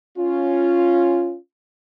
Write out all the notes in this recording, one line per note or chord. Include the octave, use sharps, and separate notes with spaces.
C#4 F4